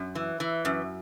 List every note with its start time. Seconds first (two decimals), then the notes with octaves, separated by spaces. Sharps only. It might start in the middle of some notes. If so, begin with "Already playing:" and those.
Already playing: F#2
0.15 E3
0.40 E3
0.65 F#2